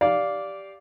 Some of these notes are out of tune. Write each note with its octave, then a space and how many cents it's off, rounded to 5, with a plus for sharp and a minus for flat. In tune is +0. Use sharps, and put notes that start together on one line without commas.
G4 +0 D5 -10 F5 +0